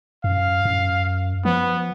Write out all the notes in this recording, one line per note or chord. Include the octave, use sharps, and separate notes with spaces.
F#2 F5
F#2
F3 B3